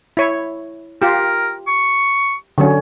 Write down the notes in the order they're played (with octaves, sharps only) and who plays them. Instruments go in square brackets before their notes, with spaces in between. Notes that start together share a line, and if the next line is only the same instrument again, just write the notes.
[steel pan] E4 C#5
[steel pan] F4 G4 [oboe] A#4
[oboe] C#6
[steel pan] D3 F#3 C#4